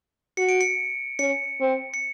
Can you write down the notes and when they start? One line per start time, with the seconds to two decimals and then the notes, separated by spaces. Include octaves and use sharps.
0.37 F#4 C#7
0.49 D7
0.61 C#7
1.19 C#4 C#7
1.61 C4
1.94 C#7